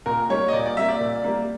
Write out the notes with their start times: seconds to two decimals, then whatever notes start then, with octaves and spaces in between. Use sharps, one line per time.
0.06 A#2 A#4
0.29 G3 A#3 C#5
0.48 D#5
0.53 A#2 D5
0.66 D5
0.76 G3 A#3 E5
0.88 D5
1.00 A#2
1.24 G3 A#3